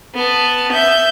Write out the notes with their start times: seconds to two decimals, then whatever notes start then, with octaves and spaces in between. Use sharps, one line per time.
0.15 B3 A5
0.73 E5 G6